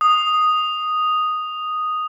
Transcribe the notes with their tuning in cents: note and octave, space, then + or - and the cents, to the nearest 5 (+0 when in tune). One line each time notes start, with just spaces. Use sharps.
D#6 -5